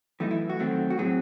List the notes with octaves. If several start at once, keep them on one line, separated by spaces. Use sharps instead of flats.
F#2 E3 A3 D#4
E4
F#4
F#2 D#3 F#3 A3 C4
F#4
A2 F#3 C4 G#4